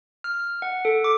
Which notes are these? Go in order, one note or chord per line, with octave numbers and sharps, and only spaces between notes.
F6
F#5
A4
D6